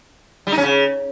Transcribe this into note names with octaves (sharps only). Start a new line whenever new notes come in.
G3
D#4
C#4
C#3